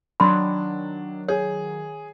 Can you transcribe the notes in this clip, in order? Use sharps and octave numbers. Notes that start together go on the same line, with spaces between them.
D#3 F#3 D4 B5 C6
G#4 C#5